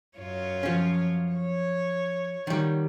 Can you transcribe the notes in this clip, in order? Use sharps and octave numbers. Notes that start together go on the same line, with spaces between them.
F#2 F4 C#5
F3 C#4
C#5
D#3 G3